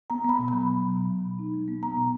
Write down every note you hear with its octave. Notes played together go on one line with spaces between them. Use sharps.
B3 A#5
B3 B5
B2
F#3 B5
F#3
F#3
B2
F#3
B2
D#4
G#3
B3
B3 A#5
B2